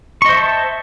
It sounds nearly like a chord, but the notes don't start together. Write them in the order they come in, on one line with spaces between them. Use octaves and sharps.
C#6 D#5 C5 E5 A5